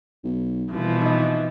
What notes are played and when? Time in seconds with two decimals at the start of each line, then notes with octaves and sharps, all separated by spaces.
0.24 B1
0.72 C2 B2 E3 F3
1.02 D#4 D#5